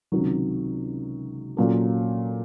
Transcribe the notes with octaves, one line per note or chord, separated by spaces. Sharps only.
C#2 C3 D#3 F#3
A#2 F#3 A#3 C#4 A4